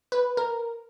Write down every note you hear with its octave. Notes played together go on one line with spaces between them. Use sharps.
B4
A#4